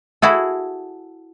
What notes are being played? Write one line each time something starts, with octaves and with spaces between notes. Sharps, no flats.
E4 F#4 G#4 A4